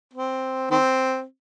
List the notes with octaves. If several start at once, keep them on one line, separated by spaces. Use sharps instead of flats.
C4
D#3 C4